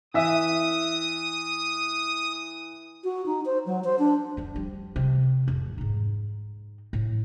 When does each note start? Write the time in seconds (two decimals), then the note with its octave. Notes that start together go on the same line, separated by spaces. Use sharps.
0.14 E3 E5 D#6
3.04 F#4
3.26 D#4
3.46 C5
3.66 F#3
3.84 C5
3.99 D4
4.37 F2 F3
4.56 G3
4.96 C3
5.46 A1 F2
5.78 G#2 D#4
6.93 A2